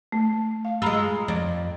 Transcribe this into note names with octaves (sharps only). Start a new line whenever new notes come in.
A3
F5
G#3 F4 A#5 B5 E6
F2 D5